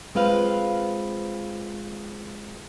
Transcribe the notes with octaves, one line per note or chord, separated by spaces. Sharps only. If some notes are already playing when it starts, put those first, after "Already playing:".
G#3 C4 F4 B4 F5